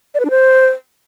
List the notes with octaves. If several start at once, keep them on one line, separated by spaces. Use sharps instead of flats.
D5
B4
D4
C5